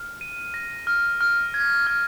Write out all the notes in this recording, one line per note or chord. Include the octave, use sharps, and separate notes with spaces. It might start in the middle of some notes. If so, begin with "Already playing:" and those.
Already playing: F6
D#7
A#6
F6
F6
G#6
F6